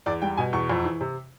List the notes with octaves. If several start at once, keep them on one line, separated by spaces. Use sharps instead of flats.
E2 D5
G3 G5
B2 G#5
E2 C#6
F2
E3
C3